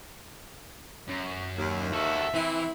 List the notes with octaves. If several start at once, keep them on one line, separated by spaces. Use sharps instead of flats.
F#2
D#2
F#4 A4 E5
E3 C4 E4